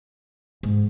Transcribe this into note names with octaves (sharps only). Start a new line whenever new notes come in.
G#2